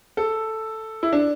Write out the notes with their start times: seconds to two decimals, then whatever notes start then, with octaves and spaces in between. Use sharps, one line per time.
0.17 A4
1.03 E4
1.13 D4